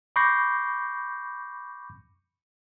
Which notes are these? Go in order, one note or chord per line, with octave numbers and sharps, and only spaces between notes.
B5 C#6 D6 G6 A#6 C7